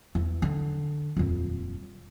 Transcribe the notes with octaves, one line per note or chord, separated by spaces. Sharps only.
E2
D3
D#1 F2